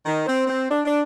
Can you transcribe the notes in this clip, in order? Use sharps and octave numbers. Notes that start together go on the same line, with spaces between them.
D#3
C4
C4
D4
D4